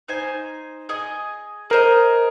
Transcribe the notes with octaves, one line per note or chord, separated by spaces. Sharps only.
D#4 C5 G#5
G#4 D#5 G#5
G#4 A#4 C5 D#5